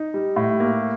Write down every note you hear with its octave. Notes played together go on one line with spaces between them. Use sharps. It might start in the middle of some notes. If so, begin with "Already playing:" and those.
Already playing: D#4
G3
A2
A#3